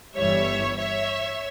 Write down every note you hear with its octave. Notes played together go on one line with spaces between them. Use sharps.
G1 G2 E3 G3 C#5 E5
C#5 E5